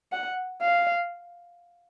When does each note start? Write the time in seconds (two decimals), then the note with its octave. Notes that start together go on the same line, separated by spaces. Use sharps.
0.12 F#5
0.62 F5